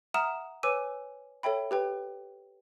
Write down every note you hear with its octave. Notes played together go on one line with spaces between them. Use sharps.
E5 F#5 A#5 D#6 F6 E7
B4 C#5 G#5 D6 E6 D#7
A4 C#5 E5 G5 B5
G4 B4 G5